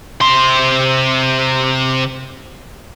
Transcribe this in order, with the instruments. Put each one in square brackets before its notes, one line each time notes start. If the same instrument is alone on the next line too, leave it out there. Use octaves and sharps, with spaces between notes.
[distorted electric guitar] C3 C6